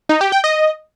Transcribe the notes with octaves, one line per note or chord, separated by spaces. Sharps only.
D#4
G4
G5
D#5